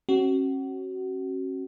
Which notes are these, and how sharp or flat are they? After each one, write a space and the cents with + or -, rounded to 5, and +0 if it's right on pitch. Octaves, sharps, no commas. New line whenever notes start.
C#4 -40 F#4 +25